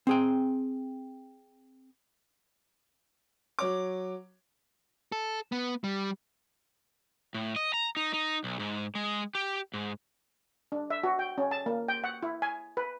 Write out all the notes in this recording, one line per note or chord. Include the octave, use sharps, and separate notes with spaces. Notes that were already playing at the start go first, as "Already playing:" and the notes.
C4 G#4 G5
F#3 C#5 D6
A4
B3
G3
A2
D#5
A#5
D#4
D#4
B1
G#2
G#3
G4
G#2
D4
E5
F#4
G5
C#4
A5
A#3
G5
F#5
E4
G#5
B4